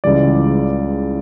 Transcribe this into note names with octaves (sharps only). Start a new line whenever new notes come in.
C#2 C#3 E3 G3 D5